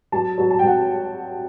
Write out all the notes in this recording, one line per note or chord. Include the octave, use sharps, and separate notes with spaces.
F#3 A5
F#3
A5
G5
F#3 F#5